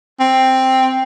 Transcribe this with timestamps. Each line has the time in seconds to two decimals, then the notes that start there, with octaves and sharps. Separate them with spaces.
0.20 C4